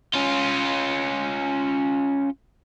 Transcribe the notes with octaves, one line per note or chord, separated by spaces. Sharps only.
C#4 F4